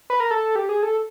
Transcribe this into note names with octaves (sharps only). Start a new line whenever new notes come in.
B4
A#4
A4
G4
G#4
A4